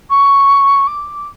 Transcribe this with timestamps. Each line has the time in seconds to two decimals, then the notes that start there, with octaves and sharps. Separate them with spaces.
0.10 C#6
0.87 D6